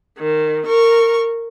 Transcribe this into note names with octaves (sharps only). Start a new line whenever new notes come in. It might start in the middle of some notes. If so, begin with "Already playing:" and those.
D#3
A#4 C#6